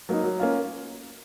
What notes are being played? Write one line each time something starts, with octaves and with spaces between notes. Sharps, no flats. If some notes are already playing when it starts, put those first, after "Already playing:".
F#3 A#3 D#4
F#3
A#3 C#4 F4